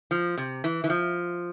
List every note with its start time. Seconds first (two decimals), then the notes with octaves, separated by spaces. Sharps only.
0.11 F3
0.38 C3
0.64 E3
0.84 E3
0.90 F3